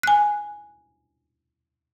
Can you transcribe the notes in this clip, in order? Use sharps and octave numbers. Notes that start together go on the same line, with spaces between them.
G#5 F#6